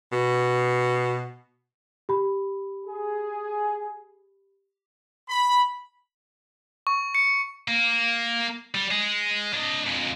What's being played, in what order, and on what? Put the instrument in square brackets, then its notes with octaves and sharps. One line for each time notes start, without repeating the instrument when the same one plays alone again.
[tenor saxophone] B2
[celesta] G4 B5
[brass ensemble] G#4
[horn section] B5
[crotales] C#6
C#7
[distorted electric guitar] A#3
G3
G#3
D4 D#5
F2 G#3